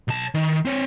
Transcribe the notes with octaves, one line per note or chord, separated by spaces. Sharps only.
B1 A5
D#3
C4 C#5